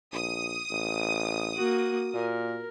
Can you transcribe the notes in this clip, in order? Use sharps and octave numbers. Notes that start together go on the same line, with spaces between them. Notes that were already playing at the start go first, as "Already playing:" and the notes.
A#1 D#6
A1
A#3 F#4
A#2 A#4